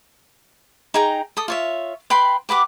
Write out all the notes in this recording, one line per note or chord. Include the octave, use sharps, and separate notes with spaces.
D#4 G#4 G5 A#5
A4 D#6
F4 C#5 E5
B4 G5 B5 C6
G4 B4 F#5 D6